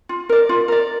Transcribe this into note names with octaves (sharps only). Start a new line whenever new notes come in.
F4
A#4 D5
F4
A#4 D5